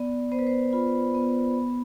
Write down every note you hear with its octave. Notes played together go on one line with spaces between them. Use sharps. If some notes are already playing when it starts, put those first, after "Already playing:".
Already playing: B3 D5
B3 C5
B4
C5
F4 B5
B3
B3